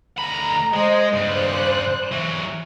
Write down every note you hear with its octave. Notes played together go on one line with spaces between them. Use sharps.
D2 A#5 B5
G#3 C5 D#5
G2 C#3 C5 D5 F#6
E3 F#3